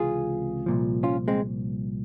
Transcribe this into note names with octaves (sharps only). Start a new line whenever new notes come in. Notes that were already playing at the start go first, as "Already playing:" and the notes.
Already playing: C#2 C3 E3 F4 G#4
C2 A#2 F3
C#4 F4
G#3 C4